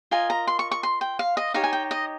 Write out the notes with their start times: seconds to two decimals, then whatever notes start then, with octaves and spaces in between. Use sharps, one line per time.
0.11 F4 A#4 D#5 G#5
0.30 A#5
0.47 C6
0.59 C#6
0.71 C#6
0.83 C6
1.01 G5
1.19 F5
1.37 D#5
1.54 D#4 G4 C#5 F5
1.64 G#5
1.73 G5
1.91 D#5